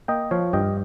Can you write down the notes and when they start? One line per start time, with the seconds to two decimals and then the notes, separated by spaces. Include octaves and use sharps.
0.08 A#3 D#5 G5
0.31 F3 C#5 F5
0.53 G2 D#5 G5